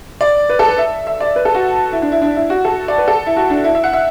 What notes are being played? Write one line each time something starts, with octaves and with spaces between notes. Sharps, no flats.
D5
B4
A4
B4
E5
E5
D5
B4
A4
F#4
E4
D4
E4
D4
E4
F#4
A4
D5
B4
A4
E4
F#4
D4
E4
E5
F#5
E5